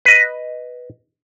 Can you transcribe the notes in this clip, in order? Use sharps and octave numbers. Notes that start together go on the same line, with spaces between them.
B4 D#5